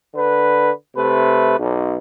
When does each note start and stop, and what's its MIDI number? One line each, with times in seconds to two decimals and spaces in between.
0.15 0.70 50
0.15 0.70 71
0.96 1.56 48
0.96 1.56 57
0.96 1.56 71
1.58 1.96 35